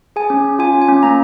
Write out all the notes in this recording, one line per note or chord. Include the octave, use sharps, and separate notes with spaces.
G#4 G#5
C#4
C#4
F4 G#5
C#4
G#5
C#4
A#3 A#5